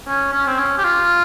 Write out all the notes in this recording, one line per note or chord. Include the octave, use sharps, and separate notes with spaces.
C#4
C#4
C4
C#4
G4
F4